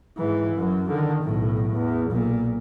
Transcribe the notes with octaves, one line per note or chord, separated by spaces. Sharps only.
G#2 E3
F#2 F#3
D3 D#3
B1 A2
E2
B1 A#2